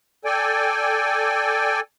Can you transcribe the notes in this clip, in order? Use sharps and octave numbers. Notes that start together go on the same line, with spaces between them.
A4 D5 G5 G#5